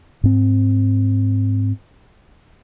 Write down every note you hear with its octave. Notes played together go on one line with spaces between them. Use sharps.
G#2 C4